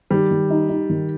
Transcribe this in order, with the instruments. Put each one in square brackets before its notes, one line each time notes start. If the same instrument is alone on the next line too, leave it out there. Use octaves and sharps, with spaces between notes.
[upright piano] D#3 [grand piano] G3
[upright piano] D#3
D#4
D#4
D#3